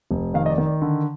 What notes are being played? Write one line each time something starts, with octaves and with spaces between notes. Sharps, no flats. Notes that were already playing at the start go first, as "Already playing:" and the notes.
F1
D#3 F5
D#5
D5
D#3
D5
D3